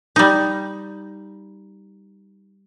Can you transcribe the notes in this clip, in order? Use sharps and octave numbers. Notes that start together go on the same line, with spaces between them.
G3 D#4